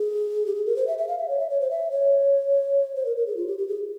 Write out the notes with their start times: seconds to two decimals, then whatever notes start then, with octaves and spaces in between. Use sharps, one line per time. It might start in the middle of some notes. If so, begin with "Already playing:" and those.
Already playing: G#4
0.46 G4
0.55 G#4
0.66 A#4
0.76 C5
0.87 E5
0.98 E5
1.08 F5
1.18 E5
1.29 C#5
1.39 E5
1.50 C#5
1.60 C5
1.71 E5
1.91 C#5
2.96 C5
3.05 A#4
3.17 A#4
3.26 G#4
3.37 F4
3.47 G4
3.58 G4
3.68 G#4